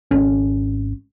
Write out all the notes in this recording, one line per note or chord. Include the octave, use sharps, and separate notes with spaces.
G#1 C#4